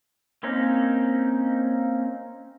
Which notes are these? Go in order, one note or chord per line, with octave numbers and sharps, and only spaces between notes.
A#3 C4 C#4 D#4